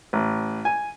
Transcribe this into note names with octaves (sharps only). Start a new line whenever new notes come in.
A1
G#5